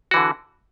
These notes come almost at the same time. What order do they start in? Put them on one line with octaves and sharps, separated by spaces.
F#4 E3 D3